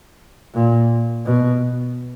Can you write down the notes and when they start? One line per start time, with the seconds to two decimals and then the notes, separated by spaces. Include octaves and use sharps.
0.54 A#2
1.25 B2